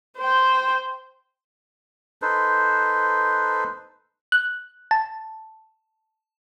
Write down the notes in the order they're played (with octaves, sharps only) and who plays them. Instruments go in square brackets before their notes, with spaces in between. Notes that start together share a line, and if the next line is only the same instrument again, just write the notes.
[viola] C5 G5
[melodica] D#4 A4 B4 C5
[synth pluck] F#6
A5